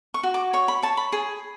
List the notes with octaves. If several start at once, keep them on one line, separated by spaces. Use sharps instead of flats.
C#6
F#4
D6
C#5 C#6
B5
C#5 A5
B5
G#4